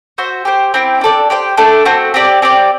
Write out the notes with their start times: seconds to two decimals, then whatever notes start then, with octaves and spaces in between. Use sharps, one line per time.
0.18 F#4 C5 E5
0.45 G4 C5 G5
0.74 C4 E4 G4
1.01 D4 A4 D5
1.30 G4 C5 G5
1.57 A3 D4 A4
1.85 A3 C4 F#4
2.14 C4 G4 D5
2.42 C4 G4 D5